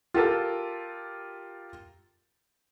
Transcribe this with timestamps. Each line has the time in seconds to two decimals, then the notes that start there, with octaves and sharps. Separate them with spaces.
0.14 F4 G4 A4 A#4